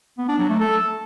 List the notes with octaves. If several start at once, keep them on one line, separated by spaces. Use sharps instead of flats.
B3
D4
F#3
A3
A4